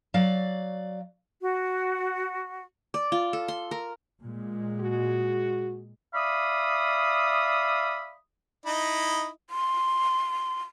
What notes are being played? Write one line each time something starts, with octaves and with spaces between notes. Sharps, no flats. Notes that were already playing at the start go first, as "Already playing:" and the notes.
F#3 D5 F5
F#4
D5
F4
A4
C6
A#4
A#2 G#3
F#4 G#4
D5 E5 F5 B5 D#6
D#4 E4 D#5
C6